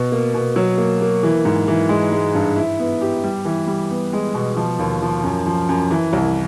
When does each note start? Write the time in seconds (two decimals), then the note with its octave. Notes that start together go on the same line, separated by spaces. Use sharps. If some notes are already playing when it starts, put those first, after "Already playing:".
Already playing: B2
0.12 A#3
0.34 B2
0.56 F#3
0.78 A#3
1.01 A#3
1.23 E3
1.45 G#2
1.68 E3
1.89 G#3
2.12 G#3
2.35 G2
2.56 E4
2.79 B3
3.01 G4
3.24 G3
3.45 E3
3.67 G3
3.91 B3
4.13 G#3
4.34 B2
4.57 F3
4.79 D#2
5.02 F3
5.24 F#2
5.46 F3
5.69 F#2
5.91 E3
6.13 C2